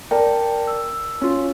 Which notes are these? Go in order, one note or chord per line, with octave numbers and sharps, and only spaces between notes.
A#4 D5 G5 A5
E6
C#4 F4